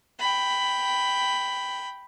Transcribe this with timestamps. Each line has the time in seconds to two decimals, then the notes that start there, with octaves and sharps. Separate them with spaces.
0.19 G5 B5